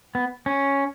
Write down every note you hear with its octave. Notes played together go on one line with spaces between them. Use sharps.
B3
C#4